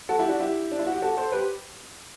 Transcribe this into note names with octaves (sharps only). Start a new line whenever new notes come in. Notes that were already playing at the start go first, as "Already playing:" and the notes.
F#4 A4
E4 G4
D4 F#4
E4 G4
D4
E4
F#4
G4
F#4 A4
A4 C5
G4 B4